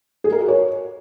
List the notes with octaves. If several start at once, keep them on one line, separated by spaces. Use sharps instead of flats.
G#4
A#4
F#4
C#5